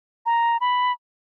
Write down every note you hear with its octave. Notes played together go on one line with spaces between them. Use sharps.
A#5
B5